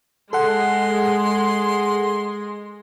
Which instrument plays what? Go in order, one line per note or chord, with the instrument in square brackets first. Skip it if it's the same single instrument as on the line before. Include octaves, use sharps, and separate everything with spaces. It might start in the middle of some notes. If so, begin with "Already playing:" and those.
[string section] G#3 [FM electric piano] A4 F#5 [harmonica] C6